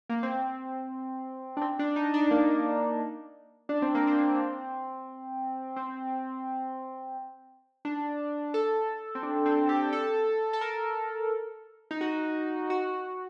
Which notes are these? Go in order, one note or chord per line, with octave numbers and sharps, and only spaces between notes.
A#3
C4
D4
C4
D4
D#4
D4
A#3
D4
C4
A#3
C4
C4
D4
A4
C4
D4
C4
G4
A4
A4
A#4
D#4
F#4
F#4